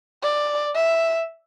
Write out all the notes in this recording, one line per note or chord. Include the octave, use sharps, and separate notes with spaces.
D5
E5